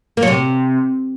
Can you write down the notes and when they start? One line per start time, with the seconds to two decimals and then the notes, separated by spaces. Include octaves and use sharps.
0.17 A#3
0.22 F#3
0.28 C3